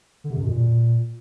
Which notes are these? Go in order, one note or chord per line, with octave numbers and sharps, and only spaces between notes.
D3
C3
F#2
B2
A#2